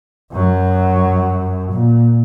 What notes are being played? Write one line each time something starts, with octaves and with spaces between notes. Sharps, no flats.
F#2 F#3
A#2